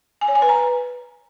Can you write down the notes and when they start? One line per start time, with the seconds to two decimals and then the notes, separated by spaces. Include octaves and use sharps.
0.21 G#5
0.28 C#5
0.35 G#5
0.42 B4
0.49 A#5